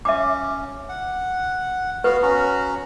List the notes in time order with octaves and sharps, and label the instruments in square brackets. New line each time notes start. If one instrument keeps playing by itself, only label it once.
[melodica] C#4 [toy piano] E5 D6
[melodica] F#5
[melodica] B3 F#4 F5 [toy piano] B4
[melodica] C#4 F#4 A#5